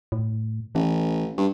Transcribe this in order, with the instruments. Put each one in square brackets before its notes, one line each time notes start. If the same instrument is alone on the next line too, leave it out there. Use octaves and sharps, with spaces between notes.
[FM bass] A2
[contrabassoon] A1 [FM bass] E3
[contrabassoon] G2